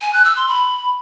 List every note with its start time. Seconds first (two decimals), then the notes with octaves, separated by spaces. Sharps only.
0.01 G#5
0.13 F#6
0.25 E6
0.36 C6
0.48 B5